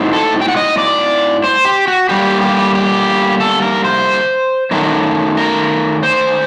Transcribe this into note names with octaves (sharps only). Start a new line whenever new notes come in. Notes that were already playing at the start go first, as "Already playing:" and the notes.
Already playing: A2 F#3 C4 D#4
A4
G5
F#5
D#5
D5
C5
G4
F#4
D3 G3 A#3 G4
G4
G4
A4
A#4
C5
F#2 D#3 F#3 A3 A#4
A#4
C5